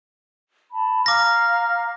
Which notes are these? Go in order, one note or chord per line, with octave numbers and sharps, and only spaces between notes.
A5 B5
F5 A#5 D6 F6 A#6